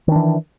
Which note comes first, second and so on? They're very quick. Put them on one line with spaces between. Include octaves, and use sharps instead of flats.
D#3 D4 E3